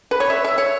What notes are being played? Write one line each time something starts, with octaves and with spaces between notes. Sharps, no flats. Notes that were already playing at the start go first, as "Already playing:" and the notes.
B4
C#5
E5
E5
C#5